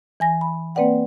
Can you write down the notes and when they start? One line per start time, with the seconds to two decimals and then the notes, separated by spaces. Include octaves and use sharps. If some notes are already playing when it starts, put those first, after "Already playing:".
0.20 E3 G#5 A#6
0.41 B5
0.75 A#3 C4 B4 D5 F#5 G5